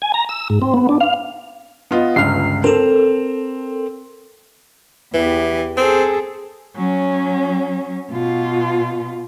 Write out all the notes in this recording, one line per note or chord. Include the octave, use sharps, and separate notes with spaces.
G#5
A#5
E6
G#2
C4
B3
D4
F5
B3 F4 D#5
G1 C#2 F6 C7
C4 A4 A#4
E2 E3 G4
C4 G#4 A4
F#3 C#4
B2 F4